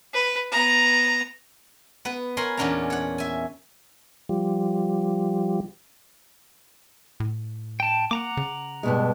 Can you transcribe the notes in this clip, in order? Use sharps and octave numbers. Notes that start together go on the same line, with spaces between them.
B4
B3 A#5
B3 B4
A#4 C#5 G#5 B5 C6
E2 A#2 C#4 D4 F#5 A#5
C#5 F#5
E5 G#5
F3 G3
A2
G5 A5
A#3 F#5 A#5 D6
C#3
G2 B2 G#3